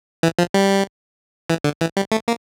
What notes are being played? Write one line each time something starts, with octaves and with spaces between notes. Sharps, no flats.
E3
F3
G3
E3
D3
E3
G3
A3
A#3